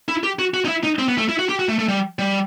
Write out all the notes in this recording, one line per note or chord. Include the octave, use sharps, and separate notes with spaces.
E4
G4
F#4
F#4
D#4
E4
D#4
C4
B3
A3
E4
F#4
G4
F#4
A3
A3
G3
G3